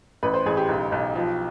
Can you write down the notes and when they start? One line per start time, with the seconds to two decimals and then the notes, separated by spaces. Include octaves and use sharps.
0.23 A1 B4
0.34 C5
0.46 A1 G#4
0.57 G4
0.69 B1
0.92 B1
1.15 F3